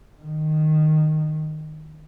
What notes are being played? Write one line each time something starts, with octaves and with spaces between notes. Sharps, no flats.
D#3